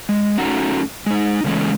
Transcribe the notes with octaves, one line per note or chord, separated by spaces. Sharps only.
G#3
A3 C#4 D#4 F#4 F#5 A#5
G#3 D#4
C#3 E3 G#3 A3 C#4